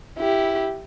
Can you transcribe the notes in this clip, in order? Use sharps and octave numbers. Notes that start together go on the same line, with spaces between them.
E4 G4